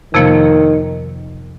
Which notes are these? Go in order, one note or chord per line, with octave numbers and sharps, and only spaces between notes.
F2 C3 D#3 F3 A#3